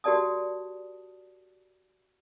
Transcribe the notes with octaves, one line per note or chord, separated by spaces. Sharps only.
F#4 G4 A#4 D5 A5 D#6